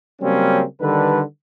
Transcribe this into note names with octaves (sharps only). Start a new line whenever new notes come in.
C#3 F#3 G3 A#3 C4 C#4
D3 D#3 G3 A4 B4